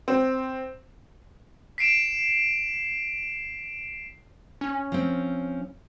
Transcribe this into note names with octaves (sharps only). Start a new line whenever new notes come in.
C4
B6 C7 D7 E7
C#4
F3 C4